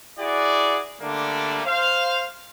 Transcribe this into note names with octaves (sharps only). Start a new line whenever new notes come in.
E4 F#4 G#4 D5
D3 G3 A3 A#3 D4
C5 F5